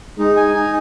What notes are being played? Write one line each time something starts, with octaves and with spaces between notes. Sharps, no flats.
G#3 D#4
G#5
D#4